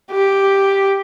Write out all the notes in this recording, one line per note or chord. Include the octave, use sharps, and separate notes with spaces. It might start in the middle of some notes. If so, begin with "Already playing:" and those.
G4